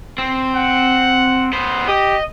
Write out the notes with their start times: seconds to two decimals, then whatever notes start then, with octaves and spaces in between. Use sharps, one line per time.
0.18 C4
0.55 F#5
1.53 B3 C5
1.88 G4 D#5